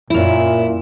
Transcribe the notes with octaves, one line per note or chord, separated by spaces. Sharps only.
F#2 A#2 E4